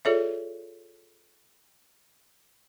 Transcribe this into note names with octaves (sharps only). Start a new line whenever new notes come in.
F4 G#4 A4 C#5 D5 E5